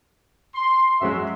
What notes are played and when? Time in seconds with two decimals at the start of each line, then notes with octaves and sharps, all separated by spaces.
0.55 C6
1.01 F#2 F#3 G#3 F#4 E5